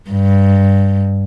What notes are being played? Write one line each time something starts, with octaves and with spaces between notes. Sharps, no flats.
G2